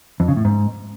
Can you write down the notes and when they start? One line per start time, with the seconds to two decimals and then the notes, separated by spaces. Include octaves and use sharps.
0.20 F2
0.28 C#3
0.36 A2
0.45 G#2